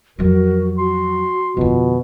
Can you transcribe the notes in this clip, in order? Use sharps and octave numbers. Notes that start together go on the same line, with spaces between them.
F2 F#3 F#4 A#4
F#4 C6
F2 B2 D3 F4